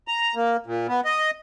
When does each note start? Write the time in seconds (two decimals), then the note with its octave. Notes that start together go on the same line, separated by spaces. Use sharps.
0.08 A#5
0.35 A#3
0.67 A#2
0.88 B3
1.05 D#5